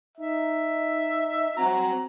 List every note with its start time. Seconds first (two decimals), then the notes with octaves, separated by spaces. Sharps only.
0.18 D#4 E5
1.57 C4 F#4 A#5